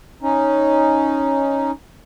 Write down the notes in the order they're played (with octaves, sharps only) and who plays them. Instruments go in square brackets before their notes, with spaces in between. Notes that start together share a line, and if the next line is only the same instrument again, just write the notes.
[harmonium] C#4 D#4